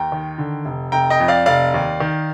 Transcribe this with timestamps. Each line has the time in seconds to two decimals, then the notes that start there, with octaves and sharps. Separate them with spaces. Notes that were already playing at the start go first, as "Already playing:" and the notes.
Already playing: D#2 G5 A#5
0.12 D#3
0.38 D3
0.65 F1
0.92 F1 G5 A#5
1.10 D#5 G5
1.20 F2
1.28 D5 F5
1.46 F1 D5 F5
1.74 D#2
2.00 D#3